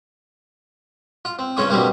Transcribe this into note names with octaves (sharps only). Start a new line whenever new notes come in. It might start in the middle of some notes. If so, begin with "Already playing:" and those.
F4
C4
G2 C#3 F4 C#5 C6 D#6
B2 D3 G3 A#3 C4 F5